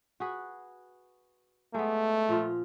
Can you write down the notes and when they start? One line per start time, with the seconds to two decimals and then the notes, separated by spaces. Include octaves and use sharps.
0.20 F#4 G#4 B4
1.74 G#3 A3 B3
2.29 A#2 F3 F4